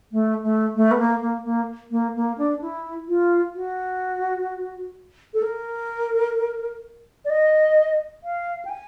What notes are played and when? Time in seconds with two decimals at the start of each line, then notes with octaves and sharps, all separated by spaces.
0.12 A3
0.43 A3
0.75 A3
0.91 B3
0.99 A#3
1.21 A#3
1.44 A#3
1.91 A#3
2.16 A#3
2.38 D4
2.61 E4
3.08 F4
3.55 F#4
5.34 A4
5.42 A#4
7.25 D5
7.30 D#5
8.23 F5
8.65 G5
8.69 G#5